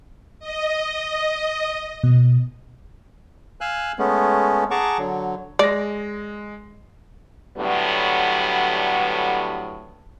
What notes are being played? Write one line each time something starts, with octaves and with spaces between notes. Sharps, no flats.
D#5
B2
F5 G#5 E6 F#6
G#3 A3 B3 C#4
G#4 F#5 A5 A#5 C#6 D6
D3 F#3
G#3 D5 A#6
A2 D3 F#3 G3 B3